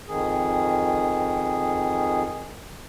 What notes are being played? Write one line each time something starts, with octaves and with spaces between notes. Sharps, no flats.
F2 D#3 G#4